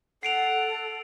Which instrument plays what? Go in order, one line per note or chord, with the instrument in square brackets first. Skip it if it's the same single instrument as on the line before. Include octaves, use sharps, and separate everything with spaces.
[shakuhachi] A4 [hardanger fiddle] F#5 [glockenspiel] C7 D7 F7